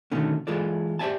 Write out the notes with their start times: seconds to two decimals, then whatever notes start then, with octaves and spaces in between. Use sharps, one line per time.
0.12 B2 D3 D#3 A3 C#4
0.47 E3 G#3 F4 A4 D5
0.99 G4 C5 D5 E5 G#5 A5